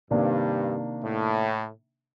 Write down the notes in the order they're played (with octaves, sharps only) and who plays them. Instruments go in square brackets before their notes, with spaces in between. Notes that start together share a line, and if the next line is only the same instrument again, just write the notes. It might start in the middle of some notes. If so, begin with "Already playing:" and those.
[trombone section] G2 [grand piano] C3 D#3 A#3 D4
[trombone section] A2